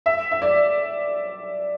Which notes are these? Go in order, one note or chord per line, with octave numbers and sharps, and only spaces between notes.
E5
E5
D5